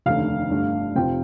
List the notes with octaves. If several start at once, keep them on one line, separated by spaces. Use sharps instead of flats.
F1 D#2 D3 A3 F5
G1 G2 D3 A3 D4
F1 F2 C3 F3 C4 G5